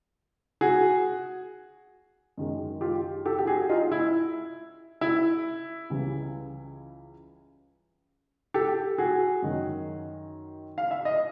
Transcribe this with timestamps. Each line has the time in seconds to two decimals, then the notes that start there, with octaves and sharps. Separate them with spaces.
0.61 F#4 G#4
2.37 F#2 D#3 G#3
2.81 F4 G4
3.26 G4 A4
3.39 G4
3.47 F#4 G#4
3.69 D#4 F4
3.92 E4
5.01 E4
5.90 C#2 C#3 E3 G3
8.54 G4 A4
8.98 F#4 G#4
9.42 F#2 D#3 F#3
10.78 F5
10.91 E5
11.05 D#5